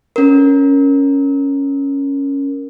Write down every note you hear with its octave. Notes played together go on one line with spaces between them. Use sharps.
C#4 A#4